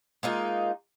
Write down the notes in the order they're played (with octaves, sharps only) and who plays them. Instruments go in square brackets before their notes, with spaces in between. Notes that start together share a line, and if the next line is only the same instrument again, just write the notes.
[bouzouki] G#3 A#3 D#4 F4